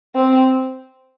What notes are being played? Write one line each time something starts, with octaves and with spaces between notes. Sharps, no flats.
C4